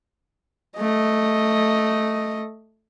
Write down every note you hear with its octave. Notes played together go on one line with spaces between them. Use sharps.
A3 D#5